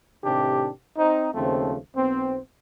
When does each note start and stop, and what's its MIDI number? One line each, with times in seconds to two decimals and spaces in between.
0.24 0.69 45
0.24 0.69 48
0.24 0.69 51
0.24 0.69 62
0.24 0.69 67
0.98 1.29 60
0.98 1.29 63
1.34 1.76 39
1.34 1.76 49
1.34 1.76 53
1.34 1.76 57
1.34 1.76 60
1.96 2.39 35
1.96 2.39 59
1.96 2.39 60